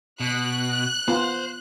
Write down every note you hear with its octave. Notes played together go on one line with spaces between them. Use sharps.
B2 F#6
B3 F4 C5